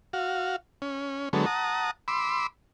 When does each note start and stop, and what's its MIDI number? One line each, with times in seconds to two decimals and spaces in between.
0.13 0.56 66
0.13 0.56 77
0.82 1.29 61
1.33 1.45 50
1.33 1.45 54
1.33 1.45 56
1.33 1.45 59
1.33 1.45 69
1.33 1.45 73
1.46 1.91 78
1.46 1.91 81
1.46 1.91 82
1.46 1.91 87
2.08 2.47 83
2.08 2.47 84
2.08 2.47 86
2.08 2.47 88